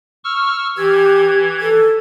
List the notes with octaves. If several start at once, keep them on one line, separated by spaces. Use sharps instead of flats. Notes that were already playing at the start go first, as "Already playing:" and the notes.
C#6 E6 F6
E3 G4 G#6
A4